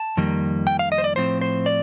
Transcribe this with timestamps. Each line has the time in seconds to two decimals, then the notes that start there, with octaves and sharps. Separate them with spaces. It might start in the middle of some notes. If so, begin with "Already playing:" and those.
Already playing: A5
0.17 F2 D#3 G3 A#3
0.67 G5
0.79 F5
0.92 D#5
0.98 C5
1.04 D5
1.16 A2 F3 C4 C5
1.41 C5
1.66 D5